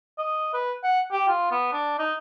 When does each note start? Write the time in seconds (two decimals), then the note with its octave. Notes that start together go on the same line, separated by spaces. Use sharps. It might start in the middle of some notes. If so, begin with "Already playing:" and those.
0.18 D#5
0.54 B4
0.84 F#5
1.12 G4
1.28 F4
1.51 B3
1.73 D4
1.99 D#4